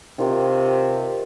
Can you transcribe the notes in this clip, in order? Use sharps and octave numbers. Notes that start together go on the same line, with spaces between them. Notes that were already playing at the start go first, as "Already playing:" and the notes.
C3 D#3 F4 G5